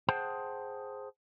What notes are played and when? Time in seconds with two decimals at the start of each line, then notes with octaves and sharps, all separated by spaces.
0.09 G#4 C5 F#5 G5 A5